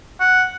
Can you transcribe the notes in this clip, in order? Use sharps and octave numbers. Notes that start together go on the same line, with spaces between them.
F#5